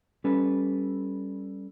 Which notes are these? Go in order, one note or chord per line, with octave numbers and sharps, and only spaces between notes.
G3 C#4 A4 B4